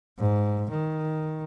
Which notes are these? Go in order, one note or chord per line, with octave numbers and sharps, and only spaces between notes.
G#2
D#3